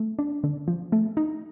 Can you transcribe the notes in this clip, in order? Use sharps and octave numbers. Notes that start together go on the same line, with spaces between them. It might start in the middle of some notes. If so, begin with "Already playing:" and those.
Already playing: A3
D4
D3
F3
A3
D#4